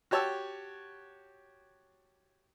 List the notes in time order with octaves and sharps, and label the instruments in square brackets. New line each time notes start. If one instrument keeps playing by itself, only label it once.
[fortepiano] F#4 G4 C#5 A5 E6